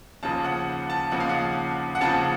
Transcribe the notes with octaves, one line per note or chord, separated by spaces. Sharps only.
D#2 C#3 F3 A5
F#5
A5
D#2 C#3 F3 F#5
F5
F#5
F#5
D#2 C#3 F3 A5